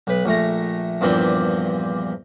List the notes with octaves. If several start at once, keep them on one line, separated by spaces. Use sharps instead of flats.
B1 B4
A#1 A3 A#5
E2 G2 A#2 F3 C4 D4